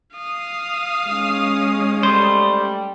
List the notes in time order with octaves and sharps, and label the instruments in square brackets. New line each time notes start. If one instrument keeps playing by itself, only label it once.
[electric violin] F5 D#6
[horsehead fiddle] G#3 C#4
[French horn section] G3 [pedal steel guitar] A3 C5